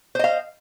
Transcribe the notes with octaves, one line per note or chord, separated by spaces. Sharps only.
C5 D#5 F5